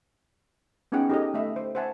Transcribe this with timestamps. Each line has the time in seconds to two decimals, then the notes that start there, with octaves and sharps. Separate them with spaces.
0.92 B3 C#4 D#4 G#4 F#5 G5
1.10 D#4 G4 A4 C#5 D#5
1.34 A3 D#5 E5
1.56 C5
1.75 C5 E5 F#5 G#5 A5